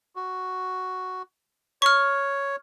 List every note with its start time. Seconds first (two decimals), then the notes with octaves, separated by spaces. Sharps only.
0.16 F#4
1.82 C#5 C#6 F6